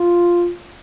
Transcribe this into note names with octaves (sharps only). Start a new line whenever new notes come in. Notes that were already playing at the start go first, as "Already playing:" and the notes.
Already playing: F4